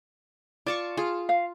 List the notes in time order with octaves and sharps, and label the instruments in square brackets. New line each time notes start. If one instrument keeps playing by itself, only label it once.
[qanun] F4 A5 C#6 [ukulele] D5
[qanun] F4 [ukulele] G#4
[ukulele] F5